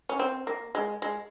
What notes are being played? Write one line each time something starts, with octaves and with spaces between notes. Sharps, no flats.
C#4
C4
A#3
G#3
G#3